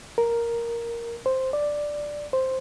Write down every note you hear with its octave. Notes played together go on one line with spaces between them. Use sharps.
A#4
C5
D5
C5